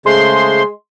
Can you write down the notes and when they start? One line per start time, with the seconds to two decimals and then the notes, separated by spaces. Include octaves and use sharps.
0.06 C#3 G#3 A3 C5 C6